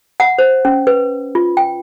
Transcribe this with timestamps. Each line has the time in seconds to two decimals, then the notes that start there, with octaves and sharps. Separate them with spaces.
0.20 F#5
0.38 C5
0.65 C#4
0.87 B4
1.35 F4
1.57 G5